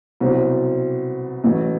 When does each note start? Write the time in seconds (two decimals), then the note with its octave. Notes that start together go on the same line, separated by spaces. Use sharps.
0.20 C2 B2 F#3 C4 F#4
1.44 A1 A2 F#3 A3